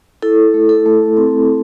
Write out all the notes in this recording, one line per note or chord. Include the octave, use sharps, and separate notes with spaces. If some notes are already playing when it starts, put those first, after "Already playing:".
E4 A4
A3
A4
A3
C4